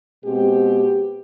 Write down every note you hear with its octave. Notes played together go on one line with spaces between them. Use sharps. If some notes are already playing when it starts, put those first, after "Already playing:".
B2 G#3 C4 G4